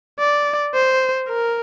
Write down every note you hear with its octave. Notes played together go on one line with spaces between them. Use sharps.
D5
C5
A#4